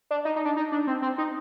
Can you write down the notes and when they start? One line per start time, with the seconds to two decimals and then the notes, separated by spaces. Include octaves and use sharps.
0.11 D4
0.25 D#4
0.36 D#4
0.45 D4
0.57 D#4
0.72 D4
0.87 C4
1.02 C4
1.18 D#4